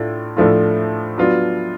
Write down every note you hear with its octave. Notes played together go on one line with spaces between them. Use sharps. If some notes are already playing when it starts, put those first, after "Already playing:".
Already playing: A2 A3 D4 F4
A2 F3 A3 D4 F4
F#3 B3 D4 F4